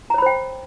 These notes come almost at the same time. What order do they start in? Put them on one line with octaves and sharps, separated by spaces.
A#5 C#5 B5 C5 G5